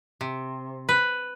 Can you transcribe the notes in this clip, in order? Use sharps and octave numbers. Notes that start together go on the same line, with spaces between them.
C3
B4